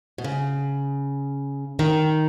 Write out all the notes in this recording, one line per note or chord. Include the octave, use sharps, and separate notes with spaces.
B2
C#3
D#3